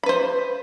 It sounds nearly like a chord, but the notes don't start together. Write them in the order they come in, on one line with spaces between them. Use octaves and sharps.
B5 B4 C5